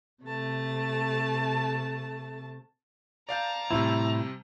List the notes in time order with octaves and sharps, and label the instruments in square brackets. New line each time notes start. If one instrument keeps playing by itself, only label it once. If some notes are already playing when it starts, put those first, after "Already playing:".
[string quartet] C3 A3 A5
[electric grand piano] D5 F5 G6 [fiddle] A5 A#5
[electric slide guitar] A2 E4 [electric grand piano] C3 G3 C4